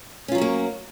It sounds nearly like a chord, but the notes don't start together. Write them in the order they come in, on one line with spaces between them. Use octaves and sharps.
C#4 F4 F#3 F#4 A#3